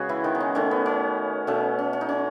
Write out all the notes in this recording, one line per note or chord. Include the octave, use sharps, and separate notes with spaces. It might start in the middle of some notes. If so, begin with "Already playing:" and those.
Already playing: C#3 G#3 B3 C#4 F#4 G#4 B4
E3 E4
D#3 D#4
B3
C#4
D#3 A3 C#4
B3
C#4
B2 A3 C#4
C#4
C#4
D#4
C#4